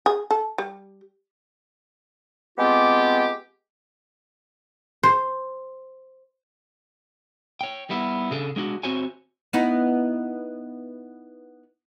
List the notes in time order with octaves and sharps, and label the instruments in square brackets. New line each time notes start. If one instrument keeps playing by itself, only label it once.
[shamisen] G#4
A4
G3
[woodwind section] G#3 B3 C4 F4 G4
[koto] C5
[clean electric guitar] C#5 G5
G3 B3 E4
C#3 D4 G#4 A4
G#3 D4 F#4
C4 F#4 C5 C#5 G#5
[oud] B3 D#4 E4